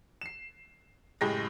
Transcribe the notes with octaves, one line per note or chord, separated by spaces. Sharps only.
C7 E7
F#1 A2 G#3 G4 G#4 A#6